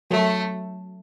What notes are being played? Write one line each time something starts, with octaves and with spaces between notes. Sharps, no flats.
F#3 A3